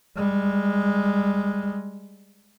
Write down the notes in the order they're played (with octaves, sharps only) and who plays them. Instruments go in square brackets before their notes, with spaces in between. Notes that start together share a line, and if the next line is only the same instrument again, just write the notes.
[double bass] G3 G#3